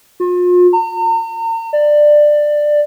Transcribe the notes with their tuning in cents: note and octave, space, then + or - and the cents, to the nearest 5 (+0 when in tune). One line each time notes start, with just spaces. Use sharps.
F4 +40
A#5 -40
D5 +15